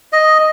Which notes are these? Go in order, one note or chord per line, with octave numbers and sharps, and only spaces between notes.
D#5